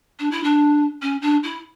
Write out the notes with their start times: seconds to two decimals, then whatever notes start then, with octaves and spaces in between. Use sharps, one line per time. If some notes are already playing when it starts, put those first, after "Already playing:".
0.19 D4
0.31 E4
0.43 D4
1.02 C#4
1.22 D4
1.43 E4